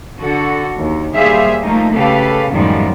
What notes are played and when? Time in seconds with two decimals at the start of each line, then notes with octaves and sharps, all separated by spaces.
0.19 D3 F#4 A4
0.78 D#2
1.14 D#2 G3 G#4 C5 E5 F5
1.63 F3 A3 A#3 D#4
1.94 C#3 G4 A4 B4 F5
2.51 F#2 A2 D#3 F3 G3 G#3